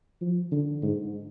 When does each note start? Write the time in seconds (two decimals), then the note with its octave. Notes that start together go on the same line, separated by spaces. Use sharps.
0.21 F3
0.51 D3
0.82 G#2